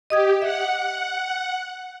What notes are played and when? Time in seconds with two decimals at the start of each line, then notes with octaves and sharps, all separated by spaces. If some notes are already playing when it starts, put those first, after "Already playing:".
0.10 G4 D#5 D#6 G#6
0.42 E5 F#5